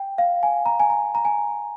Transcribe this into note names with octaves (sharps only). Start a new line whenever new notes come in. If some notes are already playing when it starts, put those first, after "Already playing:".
Already playing: G5
F5
G#5
A#5
G#5
A#5
A#5
G#5